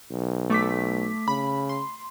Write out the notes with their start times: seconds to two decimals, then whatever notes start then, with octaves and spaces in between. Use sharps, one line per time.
0.12 B1
0.50 A3 D6 B6
1.28 C#3 B5
1.69 C6